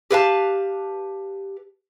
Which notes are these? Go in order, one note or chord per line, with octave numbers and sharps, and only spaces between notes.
G4 B4 F5 A5